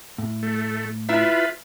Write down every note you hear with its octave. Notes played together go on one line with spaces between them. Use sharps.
A2
A3
E4 F4 B4 E5